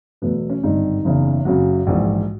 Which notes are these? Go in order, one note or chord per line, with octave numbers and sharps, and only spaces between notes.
E2 B2 F#3 A3 B3
B3
C#4
G#1 G2 D3 G3 D#4
F#1 E2 C#3
F#1 F#2 C#3 F#3 F#4
A#1 G#2 E3